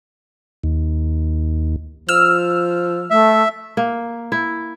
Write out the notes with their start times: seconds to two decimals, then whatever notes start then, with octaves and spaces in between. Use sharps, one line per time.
0.64 D#2
2.09 F3 E6 F6
3.10 A3 E5
3.77 A#3
4.32 E4